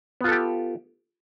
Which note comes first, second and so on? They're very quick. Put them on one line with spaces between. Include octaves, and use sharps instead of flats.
B3 F4 A4 G4